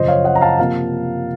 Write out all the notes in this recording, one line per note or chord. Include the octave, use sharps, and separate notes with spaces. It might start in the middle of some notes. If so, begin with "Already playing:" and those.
Already playing: F#2 C#3 F3 C5 D#5
C#5 F5
D#5 F#5
A#5
F5 A5
C3 F3 A#3 F5 A5